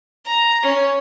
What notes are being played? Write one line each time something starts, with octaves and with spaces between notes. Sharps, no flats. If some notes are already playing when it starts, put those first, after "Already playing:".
A#5
C#4